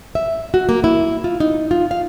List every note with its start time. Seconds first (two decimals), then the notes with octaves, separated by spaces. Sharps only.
0.15 E5
0.54 F#4
0.69 A#3
0.84 E4
1.24 F4
1.40 D#4
1.71 F4
1.91 F5